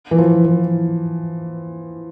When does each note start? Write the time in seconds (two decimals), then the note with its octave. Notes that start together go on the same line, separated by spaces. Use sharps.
0.11 E3
0.18 F3
0.44 E3